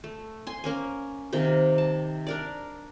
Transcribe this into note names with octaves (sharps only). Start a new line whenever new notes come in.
A3
G#5 C6
A#3 C#4 G#5
C3 D#3 A#3 A#4
A5
D4 A#4 D5